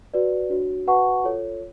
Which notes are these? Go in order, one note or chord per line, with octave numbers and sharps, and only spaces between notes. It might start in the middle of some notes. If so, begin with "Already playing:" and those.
F#4 B4 D5
D4 F#4 C#5
F#4 B4 F#5 A5 C#6
F4 A4 C#5